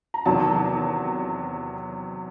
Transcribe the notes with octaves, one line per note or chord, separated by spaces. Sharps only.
A#5
E2 C3 D#3 F#3 A5